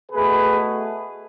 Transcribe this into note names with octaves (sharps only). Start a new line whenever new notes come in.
B2 A3 G#4 B4